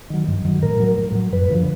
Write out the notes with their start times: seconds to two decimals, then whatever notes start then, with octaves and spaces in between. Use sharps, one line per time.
0.10 D#3 F#3
0.28 G2
0.45 D#3 F#3
0.63 A2 A#4
0.80 F#3
0.98 A2
1.15 F#3
1.33 F#2 B4
1.50 D3 F3